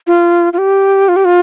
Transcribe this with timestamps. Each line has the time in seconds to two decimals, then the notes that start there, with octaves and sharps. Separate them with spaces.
0.07 F4
0.53 F4
0.58 G4
1.08 F4
1.16 G4
1.25 F4